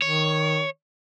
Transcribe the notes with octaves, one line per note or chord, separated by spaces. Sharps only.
D#3 C#5